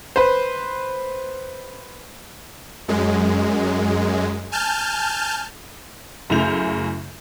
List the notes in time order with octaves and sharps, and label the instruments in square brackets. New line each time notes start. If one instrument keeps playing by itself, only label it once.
[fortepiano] B4 C5
[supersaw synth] F#2 G#3
G#5 A5 F6 G6
[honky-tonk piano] F#2 C#3 A3 E4 G6 F7